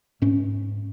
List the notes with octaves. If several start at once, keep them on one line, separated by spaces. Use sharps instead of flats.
G#2 C#4